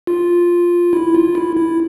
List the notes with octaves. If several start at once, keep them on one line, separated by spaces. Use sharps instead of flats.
F4
E4
F4
E4
E4